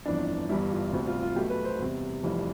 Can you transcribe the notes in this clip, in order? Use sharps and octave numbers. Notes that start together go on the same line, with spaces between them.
G1 F2 E3 D4
G1 G2 E3 G3 E4
F4
D2 C3 G3
F4
F4
B1 B2 A3 G4
B4
C5
E2 C3 G3
F1 F2 E3 G3